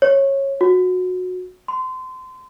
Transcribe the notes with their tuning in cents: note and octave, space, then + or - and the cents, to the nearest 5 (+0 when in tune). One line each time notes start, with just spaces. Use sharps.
C#5 -20
F#4 -20
C6 -30